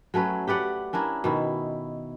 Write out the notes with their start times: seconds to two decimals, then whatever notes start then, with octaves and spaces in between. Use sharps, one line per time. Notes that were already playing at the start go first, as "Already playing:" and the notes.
0.14 F#3 A3 C#4 B4
0.47 G4 B4 D5 F#5
0.93 C#4 D4 E4 A#4
1.24 B2 D#3 E4